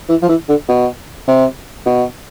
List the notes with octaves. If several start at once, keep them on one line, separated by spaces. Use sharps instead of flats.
E3
F3
E3
D3
B2
C3
B2